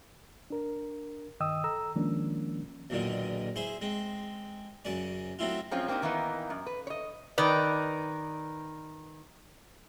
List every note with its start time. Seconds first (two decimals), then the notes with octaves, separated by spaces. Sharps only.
0.50 D4 A#4
1.40 G2 D#3 D#5 G5 D#6 E6
1.64 A4 A#5 E6
1.96 D#3 F3 G#3 A#3 C#4 D4
2.90 B1 E2 A#2 D3 D#3
3.56 E4 G#4 C5
3.81 G#3 C4
4.85 F#2 C#3 C#4 D5
5.39 F#3 A3 C4 E4 F4
5.71 F#2 F3 G#3 C4 C#4 F4
5.88 A#3 C4 D4 D#4 G4
6.02 D#3 E3 A#3 B3 D#4
6.50 F#2
6.66 B4
6.87 C#5 D#5
7.38 D#3 B4 D5